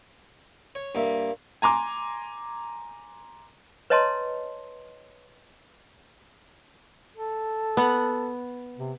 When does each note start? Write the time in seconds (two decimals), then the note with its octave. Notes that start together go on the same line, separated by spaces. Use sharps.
0.75 C#5
0.95 G2 A#3 E5
1.62 G#5 A#5 C6 D6
3.90 B4 C#5 D#5 A5 A#5 C6
7.16 A4
7.77 B3 F#5
8.78 C3